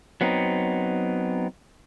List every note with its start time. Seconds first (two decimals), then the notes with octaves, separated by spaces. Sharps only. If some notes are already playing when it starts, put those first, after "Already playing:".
0.21 F#3 B3 C4 D#4